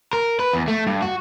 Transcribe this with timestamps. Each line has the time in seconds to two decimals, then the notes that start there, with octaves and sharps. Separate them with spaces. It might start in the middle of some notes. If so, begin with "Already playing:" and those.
0.13 A#4
0.39 B4
0.53 E2
0.68 A3
0.87 G2
1.02 F#4